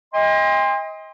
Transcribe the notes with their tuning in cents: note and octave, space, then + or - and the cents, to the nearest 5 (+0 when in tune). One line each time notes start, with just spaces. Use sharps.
D#5 +25 G5 +45 C6 +0